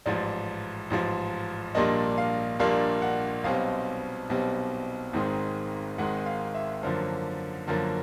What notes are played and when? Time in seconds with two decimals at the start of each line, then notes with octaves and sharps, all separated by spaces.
0.06 A1 G#2 F3 D5
0.90 A1 G#2 F3
1.75 A#1 A#2 G3 A#3 D4 D#5
2.18 F5
2.60 A#1 A#2 G3 A#3 D4 F5
3.02 F#5
3.44 B1 B2 G3 C4 F5
4.29 B1 B2 G3 C4
5.13 G#1 G#2 D#3 G#3 C4
5.98 G#1 G#2 D#3 G#3 C4 F#5
6.26 F5
6.55 E5
6.83 F#2 D3 F3 A#3 C5
7.68 F#2 D3 F3 A#3